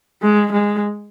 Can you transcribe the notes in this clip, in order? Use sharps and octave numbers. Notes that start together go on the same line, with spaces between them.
G#3
G#3